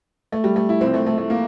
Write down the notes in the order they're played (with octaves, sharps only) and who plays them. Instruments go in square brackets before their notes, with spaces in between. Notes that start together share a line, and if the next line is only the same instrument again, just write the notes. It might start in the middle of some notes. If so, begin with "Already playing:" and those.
[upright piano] A3
G3
A3
E4
C2 C3 F3 C4
A3
A3
A3
A#3